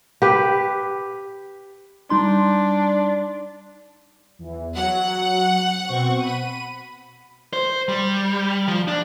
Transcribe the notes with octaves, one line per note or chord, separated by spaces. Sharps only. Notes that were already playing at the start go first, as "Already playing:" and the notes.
G4 B4
G3 D4 D#4 C6
E2 E3
F#3 F#5
B2 C4 C#6
B5 D#7
C5
G3
F3
D4